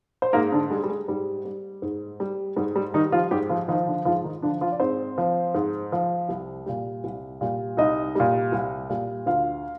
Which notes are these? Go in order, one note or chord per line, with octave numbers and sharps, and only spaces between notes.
C5
G#2 A#3 A#4
D3 D4
G3 G#3
G3
G#3
G#2 G3
G3
G#2
G3
G#2 G3
G3
D#3 G3 D#4
F3 F4
G#2 G3 G4
F3 F4
D#3 F3 D#4
D3 D4
G#2 F3 F4
D#3 D#4
D3 F3 D4
F3 F4
D5
G#2 C4 C5
F3
G#2
F3
C2
A#2 G3
C2
A#2 G3
C2 D#4 D#5
A#2 G3
C2
A#2 G3
D2 F4 F5